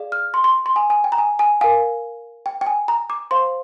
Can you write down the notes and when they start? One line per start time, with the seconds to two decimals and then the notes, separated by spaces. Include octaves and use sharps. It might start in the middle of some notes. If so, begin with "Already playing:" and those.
Already playing: G#4 D5 F5
0.12 F6
0.34 C6
0.44 C6
0.66 C6
0.76 G#5
0.90 G#5
1.04 G5
1.12 A#5
1.18 G#5
1.39 G#5
1.61 A#4 F5 G#5
2.46 G5
2.61 G5
2.67 G#5
2.88 A#5
3.10 D6
3.31 C5 F5 C6